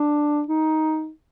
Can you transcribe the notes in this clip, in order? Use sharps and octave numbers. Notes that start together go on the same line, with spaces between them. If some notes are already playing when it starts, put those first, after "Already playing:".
Already playing: D4
D#4